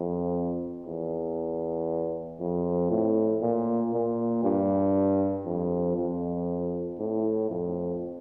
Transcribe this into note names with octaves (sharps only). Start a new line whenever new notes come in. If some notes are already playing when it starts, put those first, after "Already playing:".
Already playing: F2
E2
F2
A2
A#2
A#2
G2
F2
F2
A2
F2